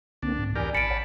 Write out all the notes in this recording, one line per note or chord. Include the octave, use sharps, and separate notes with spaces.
C2 D3 A#3 C4 D4
G#2
E2 G4 A#4 D5 G#5
A1 A5 B5 C#7 D7
C#5 D5 F#5